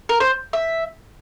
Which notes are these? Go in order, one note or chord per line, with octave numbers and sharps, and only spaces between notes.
A#4
C5
E5